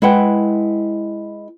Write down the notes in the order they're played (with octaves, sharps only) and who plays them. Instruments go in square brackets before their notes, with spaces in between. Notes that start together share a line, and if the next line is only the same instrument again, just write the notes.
[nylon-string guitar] G#3 E4 B4 F#5 G5